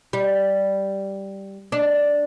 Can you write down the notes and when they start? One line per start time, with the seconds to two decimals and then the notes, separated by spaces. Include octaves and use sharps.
0.13 G3
1.72 D4